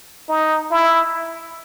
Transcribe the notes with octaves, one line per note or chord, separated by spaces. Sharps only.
D#4
E4